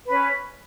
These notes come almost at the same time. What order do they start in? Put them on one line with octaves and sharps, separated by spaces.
B4 C#4 C#5